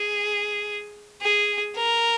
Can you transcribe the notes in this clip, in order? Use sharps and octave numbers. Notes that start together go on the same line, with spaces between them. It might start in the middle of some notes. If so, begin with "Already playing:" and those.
Already playing: G#4
G#4
A#4